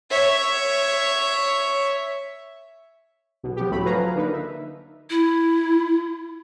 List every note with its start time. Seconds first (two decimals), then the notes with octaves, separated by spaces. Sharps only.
0.10 C#5 E5
3.43 B1 B2
3.57 F3 B3 G4
3.71 C#2 A2 F#3 A3 B5
3.85 F3 F#3 B4 F5 G#5 A#5
4.15 D3 A#3 D4 D#4 B4
4.33 E5
5.10 E4